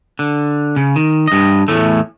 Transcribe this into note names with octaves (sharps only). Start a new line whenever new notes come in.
D3
C#3
D#3
G2 D#5
E2 A2 A3